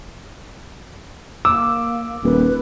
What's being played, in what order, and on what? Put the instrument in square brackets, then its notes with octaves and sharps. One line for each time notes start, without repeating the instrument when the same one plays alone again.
[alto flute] A#3 [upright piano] D6 [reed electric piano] E6
[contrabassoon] D#1 [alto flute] B4